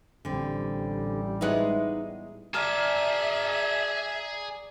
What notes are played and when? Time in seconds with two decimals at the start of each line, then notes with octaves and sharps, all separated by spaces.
0.25 A1 D3 G3 C4
1.41 G#3 B3 D#4 E4 F#5
2.54 G#4 D5 E5 F5 A5 A#5